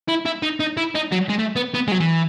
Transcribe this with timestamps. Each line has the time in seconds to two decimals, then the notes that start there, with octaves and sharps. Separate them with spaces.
0.08 E4
0.25 E4
0.42 D#4
0.60 D#4
0.77 E4
0.95 D#4
1.12 F#3
1.30 G#3
1.39 A3
1.56 B3
1.74 B3
1.88 G#3
1.92 F#3
2.00 E3